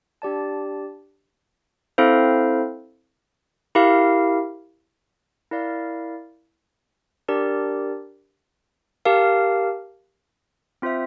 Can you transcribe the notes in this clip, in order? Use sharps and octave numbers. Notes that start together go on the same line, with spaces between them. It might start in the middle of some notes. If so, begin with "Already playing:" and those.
D4 G4 D5 A5
C4 E4 A4 C5 F5
E4 G4 A#4 F5
E4 A#4 D5 F5
D4 G4 A#4 D5
G4 A#4 F5 A5
C4 F4 C5 E5